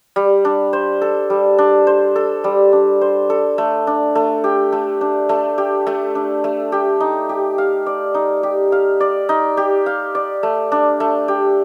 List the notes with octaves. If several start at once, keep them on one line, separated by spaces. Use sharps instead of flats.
G3
D4
C5
A4
G3
D4
C5
A4
G3
D4
C5
A4
A3
D4
A3
G4
A3
D4
A3
G4
A3
D4
A3
G4
D#4
G4
F5
D5
D#4
G4
F5
D5
D#4
G4
F5
D5
A3
D4
A3
G4